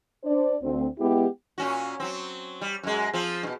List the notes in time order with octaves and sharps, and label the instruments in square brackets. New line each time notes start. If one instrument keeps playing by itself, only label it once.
[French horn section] D4 C5 D5
D2 C4
G#3 B3 E4 G4
[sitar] A#2 C#4 F#4
F#3 C4
G3
F#2 G#3
F3 C4 F4
G2 B2